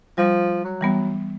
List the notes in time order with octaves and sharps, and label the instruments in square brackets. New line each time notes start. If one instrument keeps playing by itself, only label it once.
[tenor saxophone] F3 [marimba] G3
[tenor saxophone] F#3
[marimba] E3 G3 B3